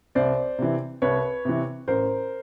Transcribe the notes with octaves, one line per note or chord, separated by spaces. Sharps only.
C2 C5 D5
C3 E3
C2 B4 C#5
C3 E3
A1 A#4 C5